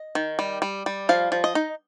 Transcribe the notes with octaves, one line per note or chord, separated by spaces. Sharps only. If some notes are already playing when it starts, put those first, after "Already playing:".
Already playing: D#5
D#3
G3
G3
G3
F3 F5
F3
D#5
D#4